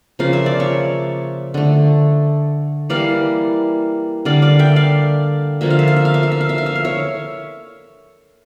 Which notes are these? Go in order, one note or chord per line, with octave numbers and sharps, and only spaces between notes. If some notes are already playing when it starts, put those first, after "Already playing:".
C#3 F3 A#3 F5
E5
D5
C#5 E5
D3 A3
E3 G3 A#3 D5 F5
D3 G3 A#3 D5 F5
D5 F5
E5 G5
D5 F5
D3 F3 A#3 E5
F5
E5
F5
E5
F5
E5
F5
E5
F5
E5
F5
E5
F5
C#5 E5